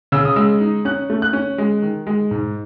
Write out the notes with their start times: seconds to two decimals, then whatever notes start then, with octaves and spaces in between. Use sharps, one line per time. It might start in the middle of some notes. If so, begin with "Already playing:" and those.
0.12 C#3 E6
0.25 D#6
0.36 G#3 E6
0.61 D#4
0.85 C#4 F#6
1.10 A3
1.22 F#6
1.33 C#4
1.58 G#3
1.82 D#3
2.07 G#3
2.31 G#2